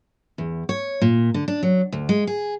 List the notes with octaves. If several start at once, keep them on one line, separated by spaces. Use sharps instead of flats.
E2
C#5
A#2
D3
D4
F#3
D2
G#3
G#4